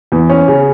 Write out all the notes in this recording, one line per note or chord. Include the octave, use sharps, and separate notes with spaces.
E2
C#4
C#3